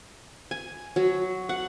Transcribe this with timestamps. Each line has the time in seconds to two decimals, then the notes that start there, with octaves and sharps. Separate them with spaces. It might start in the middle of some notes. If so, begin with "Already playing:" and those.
0.51 G#5
0.96 F#3
1.49 F#5